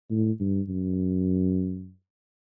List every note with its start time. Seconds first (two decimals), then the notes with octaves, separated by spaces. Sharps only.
0.11 A2
0.40 G2
0.69 F#2